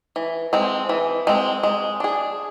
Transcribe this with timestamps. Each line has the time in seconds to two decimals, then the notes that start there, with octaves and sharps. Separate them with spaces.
0.16 E3
0.53 G#3 C4
0.89 E3
1.27 G#3 C4
1.63 G#3
2.00 D4 G#4